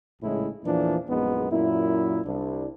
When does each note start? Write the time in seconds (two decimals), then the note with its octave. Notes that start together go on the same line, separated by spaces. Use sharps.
0.22 A#1 A2 C#3 G#3 E4
0.64 E2 A#2 E3 F3 D4
1.08 A#1 F#2 G#3 B3 D#4
1.49 F#2 A#2 E4
2.25 C2 D4